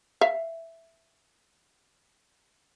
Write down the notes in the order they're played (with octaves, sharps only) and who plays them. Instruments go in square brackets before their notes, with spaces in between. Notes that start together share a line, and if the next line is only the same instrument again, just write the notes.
[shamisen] E5 F5